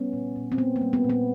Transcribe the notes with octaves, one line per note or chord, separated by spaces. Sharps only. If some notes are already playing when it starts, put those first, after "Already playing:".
Already playing: G3 B3 C#4
A#2
A#2
C4
A#3 B3
A#3
G3
B3
A#2
B3